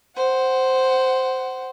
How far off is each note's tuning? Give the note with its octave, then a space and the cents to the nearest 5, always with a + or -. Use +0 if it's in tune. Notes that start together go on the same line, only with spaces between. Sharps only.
C5 -5 F#5 +20